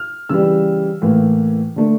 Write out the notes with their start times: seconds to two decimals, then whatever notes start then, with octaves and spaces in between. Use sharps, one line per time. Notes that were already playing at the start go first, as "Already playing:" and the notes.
Already playing: F6
0.29 C#3 E3 G3 E6
1.02 A2 E3 A#3
1.76 D3 A3